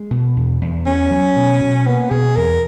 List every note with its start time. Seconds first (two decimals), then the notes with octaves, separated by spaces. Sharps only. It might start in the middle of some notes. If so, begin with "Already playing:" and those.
Already playing: G#3
0.11 B2
0.36 E2
0.61 E2
0.86 B3 C#4
1.11 F#3
1.36 B2
1.61 B2
1.86 A#3 B3
2.11 B2 G#4
2.36 E2 A#4